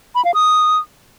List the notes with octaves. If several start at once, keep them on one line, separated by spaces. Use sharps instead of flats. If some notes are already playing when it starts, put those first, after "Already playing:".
B5
F5
D#6